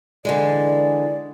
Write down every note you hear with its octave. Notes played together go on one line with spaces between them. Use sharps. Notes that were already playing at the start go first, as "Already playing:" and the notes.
D3 E3 G#3 D5